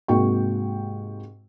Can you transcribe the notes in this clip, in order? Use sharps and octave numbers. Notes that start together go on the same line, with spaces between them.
G#2 C3 A#3 F#4 G5 C#6